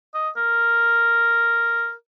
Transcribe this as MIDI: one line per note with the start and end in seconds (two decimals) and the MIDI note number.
0.14 0.30 75
0.37 1.93 70